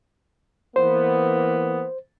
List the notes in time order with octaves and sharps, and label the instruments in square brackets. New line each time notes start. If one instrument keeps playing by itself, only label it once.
[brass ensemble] E3 A#3 B3 [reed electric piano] C5